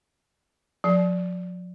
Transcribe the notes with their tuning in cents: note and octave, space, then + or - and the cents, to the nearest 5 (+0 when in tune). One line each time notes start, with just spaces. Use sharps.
F3 +45 D5 -5 A5 -40